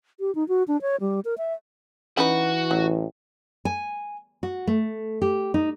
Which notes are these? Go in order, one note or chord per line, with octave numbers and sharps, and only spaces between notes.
G4
D#4
F#4
D4
C#5
G3
A#4
E5
E3 C#4 D#4 F#4 B4
A1 F#3
G#5
F#4
A3
G4
D#4